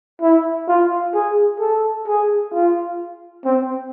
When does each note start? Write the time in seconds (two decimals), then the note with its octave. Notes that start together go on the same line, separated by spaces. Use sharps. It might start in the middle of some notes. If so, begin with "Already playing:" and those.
0.21 E4
0.68 F4
1.14 G#4
1.60 A4
2.07 G#4
2.53 F4
3.45 C4